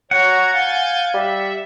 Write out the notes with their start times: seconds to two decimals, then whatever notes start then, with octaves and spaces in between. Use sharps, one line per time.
0.11 F#4 C#5 F#5 A#5 G#6
0.53 F5 G#5 G6 A6
1.14 G3 E5